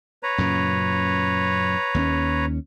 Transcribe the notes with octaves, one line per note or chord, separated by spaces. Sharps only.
B4 C#5 A#5
F#2 A#2 C#3
D#2 A#3 C#4